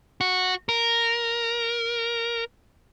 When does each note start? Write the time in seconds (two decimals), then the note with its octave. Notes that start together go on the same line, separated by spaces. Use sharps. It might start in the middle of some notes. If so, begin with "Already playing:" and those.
0.21 F#4
0.69 A#4